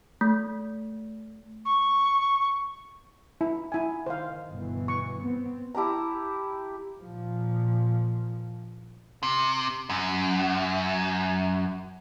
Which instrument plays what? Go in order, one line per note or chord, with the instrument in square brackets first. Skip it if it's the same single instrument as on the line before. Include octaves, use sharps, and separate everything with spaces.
[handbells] A3
[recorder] C#6
[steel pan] E4
E4 G#5
[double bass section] D#3 [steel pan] C5 F5
[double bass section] G1 B2 E3
[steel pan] C#6
[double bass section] B3 C4
[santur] E4 G4 A5 A#5
[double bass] A#2 F3
[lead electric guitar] C3
F#2